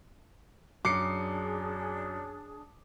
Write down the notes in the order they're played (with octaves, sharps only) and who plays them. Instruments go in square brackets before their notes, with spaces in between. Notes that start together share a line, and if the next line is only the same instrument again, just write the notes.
[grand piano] F#2 C7 C#7 [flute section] D4 G#4 [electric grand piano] D6